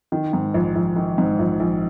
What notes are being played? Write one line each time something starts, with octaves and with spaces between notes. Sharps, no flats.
D#3
G#2
A#1
A#1
D#3
G#2
A#1
A#1